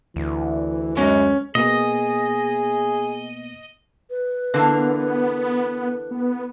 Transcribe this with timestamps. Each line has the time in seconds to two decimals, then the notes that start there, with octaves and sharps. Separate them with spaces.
0.16 D2 E3
0.97 F#2 G#3 C#4
1.55 B2 A#3 B3 G#4 D#5
4.09 B4
4.54 D3 E3 A#3 B3
6.11 B3